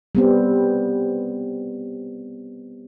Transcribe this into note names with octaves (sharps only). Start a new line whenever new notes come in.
G3 B3 C4